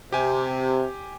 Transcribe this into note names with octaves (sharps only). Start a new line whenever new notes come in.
C3 G4 G#5